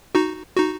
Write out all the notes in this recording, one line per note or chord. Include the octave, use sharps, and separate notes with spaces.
D#4 F#4
D#4 F#4